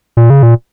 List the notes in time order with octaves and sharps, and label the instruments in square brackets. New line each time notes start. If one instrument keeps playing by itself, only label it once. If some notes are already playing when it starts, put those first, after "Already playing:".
[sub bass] A#2
C#3
A#2